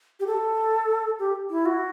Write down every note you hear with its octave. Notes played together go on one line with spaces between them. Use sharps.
G4
A4
G4
E4
F#4